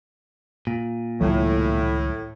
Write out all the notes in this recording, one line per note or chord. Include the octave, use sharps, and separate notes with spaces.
A#2
C#2 A2 D#3 F#3